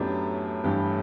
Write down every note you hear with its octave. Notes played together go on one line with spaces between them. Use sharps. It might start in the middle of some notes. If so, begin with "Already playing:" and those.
Already playing: F#2 A2 F#3 B3 D4 G4
G2 E3 B3 D4 G4